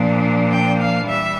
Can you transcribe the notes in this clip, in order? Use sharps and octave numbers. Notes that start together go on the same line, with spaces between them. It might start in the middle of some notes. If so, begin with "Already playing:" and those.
Already playing: A#2 F3 A#3 D4
G5
F5
E3 G3 E5